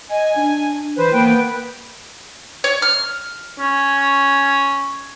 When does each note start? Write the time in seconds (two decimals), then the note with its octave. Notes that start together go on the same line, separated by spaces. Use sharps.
0.10 D#5 G#5
0.36 D4
0.98 E3 B4 C5
1.13 A#3 B3 B4 G5
2.64 C#5
2.82 F6
3.59 C#4